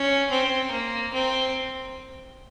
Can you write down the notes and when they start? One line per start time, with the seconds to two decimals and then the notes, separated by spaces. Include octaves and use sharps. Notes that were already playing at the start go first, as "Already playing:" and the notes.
Already playing: C#4
0.30 C4
0.71 A#3
1.13 C4